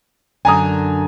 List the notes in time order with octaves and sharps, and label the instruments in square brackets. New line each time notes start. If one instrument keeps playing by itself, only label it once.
[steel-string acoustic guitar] F#2 D3 D4 [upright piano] G#5 A#5 D#6